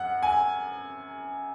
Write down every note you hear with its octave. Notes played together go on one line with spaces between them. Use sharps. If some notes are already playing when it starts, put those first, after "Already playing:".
Already playing: F#2 F#5
G#5